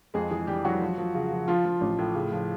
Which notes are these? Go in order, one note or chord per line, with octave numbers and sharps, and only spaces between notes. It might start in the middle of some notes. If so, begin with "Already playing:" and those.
F2 G#3 G#4
E3 G#3 G#4
E3 G3 G4
E3 F#3 F#4
F3
F3
C#3
F3
F3 F4
F3
A1
A2
C#3
F3